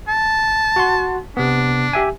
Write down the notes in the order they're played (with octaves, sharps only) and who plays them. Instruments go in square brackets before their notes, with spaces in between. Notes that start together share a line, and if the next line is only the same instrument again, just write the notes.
[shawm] A5
[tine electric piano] F#4 F#5 C6
[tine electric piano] C3 B3 [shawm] D4
[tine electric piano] G4 E5 G#5